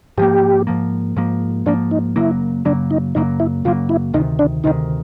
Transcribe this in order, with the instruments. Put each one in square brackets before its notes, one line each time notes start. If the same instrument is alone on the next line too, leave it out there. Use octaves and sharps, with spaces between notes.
[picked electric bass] G#2 F3 A#3 [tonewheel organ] G4
[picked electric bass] G#2 F3 A#3
G#2 F3 A#3
[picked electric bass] G#2 F3 A#3 [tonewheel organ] D4
[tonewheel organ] D#4
[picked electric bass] F#2 C#3 F#3 A#3 [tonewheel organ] E4
[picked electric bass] F#2 C#3 F#3 A#3 [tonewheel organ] D4
[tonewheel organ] D#4
[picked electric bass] F#2 C#3 F#3 A#3 [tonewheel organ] D#4
[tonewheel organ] E4
[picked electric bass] F#2 C#3 F#3 A#3 [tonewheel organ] F4
[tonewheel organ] E4
[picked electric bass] D2 C3 D#3 [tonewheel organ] D#4
[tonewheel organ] D4
[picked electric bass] D2 C3 D#3 [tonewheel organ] D#4